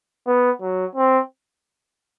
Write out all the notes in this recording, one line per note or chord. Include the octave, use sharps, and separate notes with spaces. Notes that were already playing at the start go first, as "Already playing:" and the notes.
B3
F#3
C4